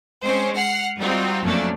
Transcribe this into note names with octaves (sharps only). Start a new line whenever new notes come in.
G#3 C4 C#4 C5
F#5 F6 C7
G3 C4 D#4 F4 F#4
F2 F#3 A3 A#3 C#4 D4